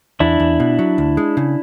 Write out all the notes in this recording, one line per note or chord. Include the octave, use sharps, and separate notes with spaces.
E2 D4 E4
E2
B2
F#3
D2
G#3
C#3